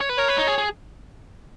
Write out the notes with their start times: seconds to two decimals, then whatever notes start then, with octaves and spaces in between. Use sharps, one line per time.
0.01 C#5
0.09 B4
0.18 A#4 C#5
0.28 B4
0.38 D#4
0.47 G#4
0.58 G#4